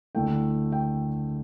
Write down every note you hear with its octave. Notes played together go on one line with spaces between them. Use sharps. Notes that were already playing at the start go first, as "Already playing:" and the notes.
D2 D3 A3 E4 G5
G5